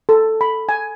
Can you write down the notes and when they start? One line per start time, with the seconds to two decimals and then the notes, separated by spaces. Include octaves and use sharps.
0.09 A4
0.41 B5
0.69 G#5